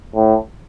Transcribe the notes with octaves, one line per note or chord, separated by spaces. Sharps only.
A2